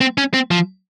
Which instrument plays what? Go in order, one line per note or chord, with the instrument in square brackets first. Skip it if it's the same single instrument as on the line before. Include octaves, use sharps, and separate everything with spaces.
[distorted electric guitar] C4
C#4
C4
F3